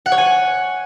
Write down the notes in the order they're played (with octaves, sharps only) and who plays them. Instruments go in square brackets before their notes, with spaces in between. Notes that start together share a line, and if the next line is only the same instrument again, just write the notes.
[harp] F#5
C#5
G#5